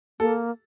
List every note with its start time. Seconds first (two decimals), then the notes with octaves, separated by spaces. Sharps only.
0.20 A#3 A4